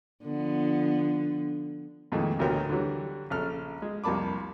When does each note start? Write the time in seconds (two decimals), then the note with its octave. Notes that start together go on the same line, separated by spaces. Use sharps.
0.24 D3 F3 B3
2.12 F2 A#2 D#3 E3 G#3 A3
2.39 A1 D2 B2 D3 A#4 G5
2.69 D3 E3 F#3 G3
3.30 A#1 C#3 A4 F6
3.82 G#3
4.04 C2 F2 A#3 A5 B5 D6